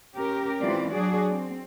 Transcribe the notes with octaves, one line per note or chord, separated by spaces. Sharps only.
C#4 G4 A#4
E3 G#3 C4 F4 D5
F#3 D4 F#4 G#4 D5
C4